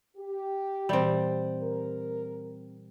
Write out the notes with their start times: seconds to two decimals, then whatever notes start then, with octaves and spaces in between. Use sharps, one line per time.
0.17 G4
0.89 A#2 E3 G3 C4
1.61 A#4